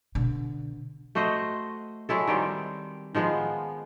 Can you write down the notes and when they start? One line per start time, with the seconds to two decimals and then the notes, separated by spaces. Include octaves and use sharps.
0.15 B2 D3
1.15 A3 F#4 C5 D#5
2.09 F#3 G#3 E4 A4
2.27 D#3 G3 C4
3.15 D#3 F3 G#3 B3